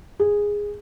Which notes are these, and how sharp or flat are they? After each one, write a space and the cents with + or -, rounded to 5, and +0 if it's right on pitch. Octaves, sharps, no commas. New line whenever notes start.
G#4 -10